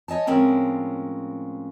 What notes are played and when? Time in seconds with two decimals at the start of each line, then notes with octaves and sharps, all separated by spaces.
0.08 C#5 D#5 G#5 A5
0.27 A2 F3 G#3 C4 C#4 A#4